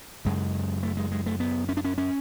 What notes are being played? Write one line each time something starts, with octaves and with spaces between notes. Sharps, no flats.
F#2 C#3 G#3
A3
G#3
G#3
A3
B3
C#4
D4
C#4
C#4